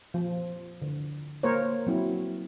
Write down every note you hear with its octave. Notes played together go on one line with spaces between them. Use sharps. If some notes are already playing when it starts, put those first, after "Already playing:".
F3
D3
A#3 A#4 C5 C#5
F#3 C4 E4